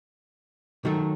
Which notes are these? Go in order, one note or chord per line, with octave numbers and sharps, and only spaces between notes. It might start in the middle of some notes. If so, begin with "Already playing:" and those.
D#3 F#3 A3